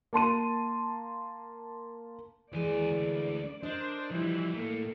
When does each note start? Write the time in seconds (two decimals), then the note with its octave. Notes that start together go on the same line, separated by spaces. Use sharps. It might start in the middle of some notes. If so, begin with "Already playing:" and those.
0.13 A#3 A5 C6 D#7
2.53 D#2 E3 G#3 D5 G#5
2.93 D2
3.63 D4 A#4 C5 D#5
4.11 E3 F3 G3
4.54 A2 A3 A#3 A4